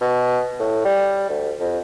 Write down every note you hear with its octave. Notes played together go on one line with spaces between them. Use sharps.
B2
A2
G3
D2
F2